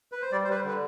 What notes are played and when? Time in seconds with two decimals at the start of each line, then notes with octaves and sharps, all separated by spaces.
0.12 B4
0.22 C5
0.32 G3 D5
0.44 C5
0.48 G3 B4
0.56 C5
0.64 D3 B4